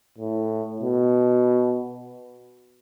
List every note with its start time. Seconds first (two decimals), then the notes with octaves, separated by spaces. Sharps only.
0.18 A2
0.81 B2